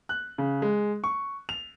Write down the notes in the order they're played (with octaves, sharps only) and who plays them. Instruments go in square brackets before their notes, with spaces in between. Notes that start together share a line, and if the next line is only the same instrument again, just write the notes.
[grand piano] F#6
C#3
G#3
C#6
F7